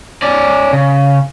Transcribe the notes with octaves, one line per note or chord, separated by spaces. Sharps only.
C#4 D5
C#3